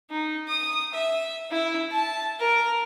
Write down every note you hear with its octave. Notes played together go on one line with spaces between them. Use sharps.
D#4
D#6
E5
E4
A5
A#4